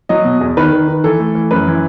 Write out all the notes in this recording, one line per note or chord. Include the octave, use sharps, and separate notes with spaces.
F#3 D#5
B2
E2
D#3 B4
D#3
D#3
E3 A4
A3
E3
F#2 B4
E3